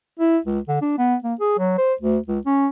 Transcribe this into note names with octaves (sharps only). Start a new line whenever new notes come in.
E4
C#2
D3
D4
B3
A#3
G#4
F#3
C5
D2
C#2
C#4